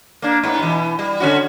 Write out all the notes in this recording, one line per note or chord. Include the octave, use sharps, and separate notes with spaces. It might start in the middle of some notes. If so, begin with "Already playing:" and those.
A#3 D4
G#2 B3
B2 E3
G3
D3 C#4 F#4